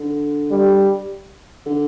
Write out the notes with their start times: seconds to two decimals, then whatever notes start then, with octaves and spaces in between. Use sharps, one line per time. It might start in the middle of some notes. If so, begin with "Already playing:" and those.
Already playing: D3
0.51 G3
1.66 D3